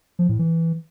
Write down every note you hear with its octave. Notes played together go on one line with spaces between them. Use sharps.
F3
A2
E3